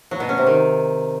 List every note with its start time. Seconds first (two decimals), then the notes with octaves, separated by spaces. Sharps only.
0.11 F#3
0.20 B2
0.29 C#4
0.38 C3
0.47 D#3